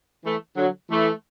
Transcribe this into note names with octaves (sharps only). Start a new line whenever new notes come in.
E3 A3
D3 F#3
E3 A3